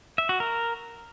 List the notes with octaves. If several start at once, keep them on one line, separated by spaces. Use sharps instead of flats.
E5
F#4
A#4